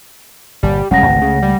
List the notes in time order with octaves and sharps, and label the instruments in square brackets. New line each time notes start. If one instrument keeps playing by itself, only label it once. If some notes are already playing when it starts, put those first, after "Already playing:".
[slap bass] G1 A#2 [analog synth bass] G3
[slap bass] F1 G3 G#3 [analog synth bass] C#3 [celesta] F#5 A#6
[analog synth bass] G#1 [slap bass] C#2 A3
[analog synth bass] C#3
G3